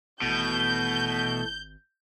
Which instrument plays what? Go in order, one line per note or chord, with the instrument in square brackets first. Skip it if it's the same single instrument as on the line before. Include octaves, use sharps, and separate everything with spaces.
[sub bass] G#1 [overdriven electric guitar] B2 [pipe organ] E3 A3 A4 [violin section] G6